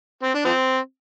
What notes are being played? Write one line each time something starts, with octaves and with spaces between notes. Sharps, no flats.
C4
D4
F3 C4